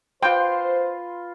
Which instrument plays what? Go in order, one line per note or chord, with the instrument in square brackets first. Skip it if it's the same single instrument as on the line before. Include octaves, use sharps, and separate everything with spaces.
[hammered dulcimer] F4 B4 C6 [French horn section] C5 [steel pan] G5